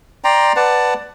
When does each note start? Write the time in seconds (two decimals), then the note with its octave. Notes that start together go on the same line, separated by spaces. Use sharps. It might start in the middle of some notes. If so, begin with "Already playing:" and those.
0.24 D5 G5 A#5 C6
0.56 B4 D5 F#5 A5